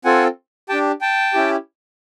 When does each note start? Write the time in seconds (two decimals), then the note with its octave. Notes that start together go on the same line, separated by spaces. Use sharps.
0.05 C4 F4 A4 F#5 G#5
0.69 D4 G4 G5 A5
1.01 G5 A5
1.34 C#4 E4 G4